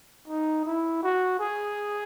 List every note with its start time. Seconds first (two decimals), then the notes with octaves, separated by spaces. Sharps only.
0.28 D#4
0.66 E4
1.03 F#4
1.40 G#4